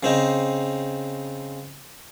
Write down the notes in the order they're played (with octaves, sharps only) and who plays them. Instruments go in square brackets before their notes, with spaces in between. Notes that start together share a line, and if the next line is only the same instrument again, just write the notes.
[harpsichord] C#3 C4 D#4